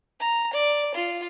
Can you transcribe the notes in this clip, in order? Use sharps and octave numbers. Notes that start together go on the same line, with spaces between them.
A#5
D5
F4